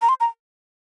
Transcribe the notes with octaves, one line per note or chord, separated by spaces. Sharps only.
A#5
C6
A#5